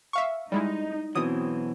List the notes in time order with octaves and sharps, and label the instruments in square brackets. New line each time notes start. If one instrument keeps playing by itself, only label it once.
[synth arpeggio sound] E5 F5 C#6
[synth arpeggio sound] G3 G#3 E4 [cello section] D#4
[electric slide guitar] B2 E3 F#3 [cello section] C4 [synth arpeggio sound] D#6